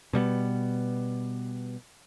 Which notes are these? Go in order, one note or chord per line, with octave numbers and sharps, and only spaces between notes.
B2 G3 A#3 B3